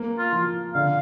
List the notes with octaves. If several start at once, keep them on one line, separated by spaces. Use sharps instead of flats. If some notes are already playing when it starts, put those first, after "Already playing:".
Already playing: A#3
F4
F3
D3 F5